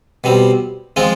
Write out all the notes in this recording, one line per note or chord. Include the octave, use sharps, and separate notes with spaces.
B2 G3 C4
F3 G#3 C4 F4